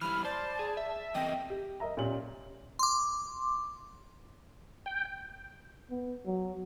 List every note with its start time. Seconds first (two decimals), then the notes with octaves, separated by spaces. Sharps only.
0.01 E3 G3 E4 B5 F6
0.25 C5 D5 A5
0.59 G#4
0.77 E5
1.15 E3 A#3 C4 D#5 G5
1.50 G4
1.80 A#4 D#5 E5 A#5
1.97 A#2 C#4 G4 F#7
2.79 C6 D6
4.86 G5
5.90 B3
6.26 F#3